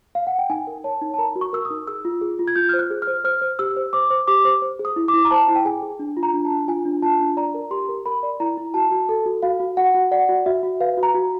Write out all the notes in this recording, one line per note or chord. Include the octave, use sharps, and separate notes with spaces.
F5
F#5
G5
D#4 G#5
A#4
C#5 A5
D#4
A5
A#4 A#5
F#4
C#6
A#4 E6
D#6
D#4
G#4 E6
F4
G#4
F4
G#6
F4 G6
C5 F6
F#6
G#4
F6
C5
C5 F6
C5
G4 E6
C5
C5 D6
C5
G4 D6
C5
C5
G#4
D#6
E4
D6
E4
A#5
C5 A5
E4
G5
G#4 G#5
G#4
D4
F4
A#5
D4
A5
D4
F4 G#5
D4
F4 A5
D4
D5 A#5
A#4
G4 C6
A#4
A#4 B5
D5
E4 A#5
E4
F#4 A5
F#4
A4
F#4
F#4 F5
F#4
F#4 F#5
F#4
D5 F#5
F#4
F#4 E5
F#4
B4 F5
F#4
A#5
F#4